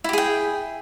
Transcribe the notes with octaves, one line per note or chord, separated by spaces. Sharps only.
E4 G4 G#4 G5